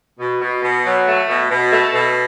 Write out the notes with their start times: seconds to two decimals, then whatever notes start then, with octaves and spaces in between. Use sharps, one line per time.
0.20 B2
0.41 B2
0.63 B2
0.85 F#3
1.06 A3
1.28 B2
1.50 B2
1.71 A3
1.94 B2